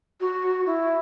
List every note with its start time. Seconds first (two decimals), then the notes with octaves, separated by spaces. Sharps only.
0.20 F#4
0.66 E4